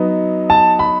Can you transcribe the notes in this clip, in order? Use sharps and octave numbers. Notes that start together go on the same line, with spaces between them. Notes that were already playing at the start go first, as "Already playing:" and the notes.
Already playing: F#3 B3 D#4
A5
B5